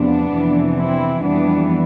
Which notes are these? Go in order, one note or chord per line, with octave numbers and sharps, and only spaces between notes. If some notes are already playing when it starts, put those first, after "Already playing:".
Already playing: E2 C3 F3 A3 B3 D4
F2 C3 E3
C4 E4
F2 E3 G3 B3 D4